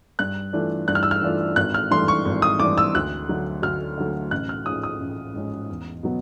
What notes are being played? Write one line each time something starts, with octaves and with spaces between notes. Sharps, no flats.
G2 F#6
E3 A3 D4 F4
G2 F#6
F6
E6
F6
E3 A3 D4 F4
G#1 F#6
F6
G2 E3 A3 D4 C6
C#6
G#1
D#6
G2 E3 A3 D4 D6
E6
D2 F#6
D3 F#3
D2 F6
D3 F#3
A1 F#6
F6
G#2 F3 G#3 C#4 D#6
D#6
A1
G#2 F3 G#3 C#4
E2
B2 F#3 B3